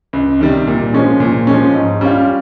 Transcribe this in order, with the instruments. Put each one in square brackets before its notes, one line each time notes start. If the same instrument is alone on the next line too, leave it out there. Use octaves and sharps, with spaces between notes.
[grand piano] C#2
C3 D#3 G3
A#2
F3 G#3 C#4
A#2
F3 G#3 C#4
G#2
G3 C#4 F4